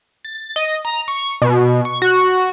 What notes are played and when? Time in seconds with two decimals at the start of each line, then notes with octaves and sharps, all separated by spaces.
0.25 A6
0.56 D#5
0.85 A#5
1.08 C#6
1.42 B2
1.85 C#6
2.02 F#4